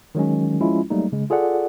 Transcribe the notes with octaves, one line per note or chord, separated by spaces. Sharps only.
D#3 F#3 G#3 C#4
F3 G#3 C#4 E4 F4
F#3 G3 A3 A#3 D#4
C#3 G#3
F4 G#4 A4 D5 F#5